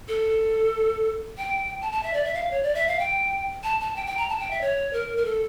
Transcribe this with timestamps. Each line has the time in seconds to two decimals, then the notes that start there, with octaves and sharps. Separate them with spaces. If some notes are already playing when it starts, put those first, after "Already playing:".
0.08 A4
1.38 G5
1.82 A5
1.92 A5
2.03 E5
2.13 D5
2.25 E5
2.34 F5
2.51 C#5
2.63 D5
2.75 E5
2.87 F5
2.99 G5
3.63 A5
3.81 A5
3.96 G5
4.06 G5
4.17 A#5
4.29 A5
4.39 G5
4.51 E5
4.61 C#5
4.93 A#4
5.17 A#4
5.25 A4